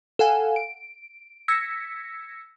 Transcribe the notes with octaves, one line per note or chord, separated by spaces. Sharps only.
A4 F5 F#5 G#5
D7
E6 G#6 A#6 B6 C#7